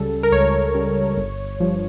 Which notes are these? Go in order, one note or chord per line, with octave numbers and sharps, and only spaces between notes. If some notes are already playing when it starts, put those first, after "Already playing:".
Already playing: C#2 C#3 G3 A4
A#4
C#2 C#5
C#3 G3
G1
G2 F3